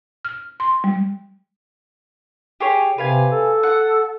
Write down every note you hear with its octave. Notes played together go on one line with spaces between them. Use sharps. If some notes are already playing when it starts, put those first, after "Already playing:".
F6
C6
G3
G4 G#4 C#5
C3 B4 F5 G#5
A4
F#5